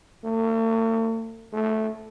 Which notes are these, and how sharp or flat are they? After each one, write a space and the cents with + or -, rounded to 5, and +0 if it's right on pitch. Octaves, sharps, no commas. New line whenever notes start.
A3 +45
A3 -10